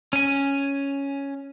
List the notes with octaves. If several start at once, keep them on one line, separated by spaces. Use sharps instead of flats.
C#4 G#5